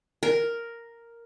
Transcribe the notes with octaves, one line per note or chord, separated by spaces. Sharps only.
A#4